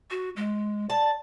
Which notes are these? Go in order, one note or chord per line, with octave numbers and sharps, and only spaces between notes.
F#4
G#3
D5 A5